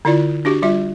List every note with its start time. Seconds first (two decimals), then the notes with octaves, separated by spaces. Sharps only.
0.05 D3 E4 F4 D5
0.45 D4 F#4 G4
0.62 G3 F4 E5